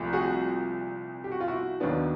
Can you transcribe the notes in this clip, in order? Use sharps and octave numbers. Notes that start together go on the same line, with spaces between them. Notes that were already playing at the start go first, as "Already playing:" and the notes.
Already playing: C2 A#2 F3 A3
F#4 G#4
G4
F#4
F4
E4 F#4
D#2 D#3 F#3 B3 D4